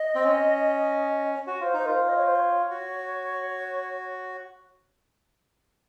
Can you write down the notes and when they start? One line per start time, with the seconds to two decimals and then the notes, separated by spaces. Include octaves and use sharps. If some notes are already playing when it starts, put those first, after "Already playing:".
Already playing: D#5
0.15 C4
0.24 C#4
1.47 F#4 C#5
1.61 F4 C5
1.74 D#4 C5
1.86 F4 A#4
1.93 C5
2.09 D#5
2.17 C#5
2.26 C5
2.35 C#5
2.70 F#4